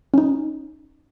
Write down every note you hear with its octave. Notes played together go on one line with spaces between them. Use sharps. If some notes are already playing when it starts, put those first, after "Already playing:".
C#4 D#4